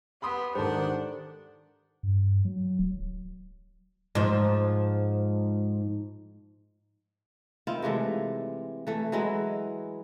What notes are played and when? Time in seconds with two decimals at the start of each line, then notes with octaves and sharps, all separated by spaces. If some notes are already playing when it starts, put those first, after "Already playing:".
0.22 B3 G4 B5 C6 D#6
0.55 G#2 D#3 D4 G4 A4 C5 F#5
2.03 G2
2.45 F#3
2.79 D1
4.15 G#2 F3
7.67 D#3 C4 E4 F4
7.82 C3 E3 G#3 A3
8.87 E3 A3
9.12 E3 F#3 G#3 E4